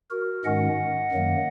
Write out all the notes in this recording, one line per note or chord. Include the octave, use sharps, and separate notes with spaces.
F#4 A#4
G#2 D#3 G#3 C#4 D#5 F#5
F#2 D#3 F#3 A#3